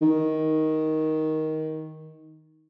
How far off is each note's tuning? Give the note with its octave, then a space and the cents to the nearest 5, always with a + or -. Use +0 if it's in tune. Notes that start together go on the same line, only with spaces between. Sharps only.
D#3 +10